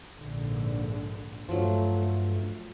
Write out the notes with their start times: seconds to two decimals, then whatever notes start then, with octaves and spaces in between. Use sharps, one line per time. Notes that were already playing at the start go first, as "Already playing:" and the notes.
0.16 A#1 G#2 D3
1.48 G2 F3 F#3 A3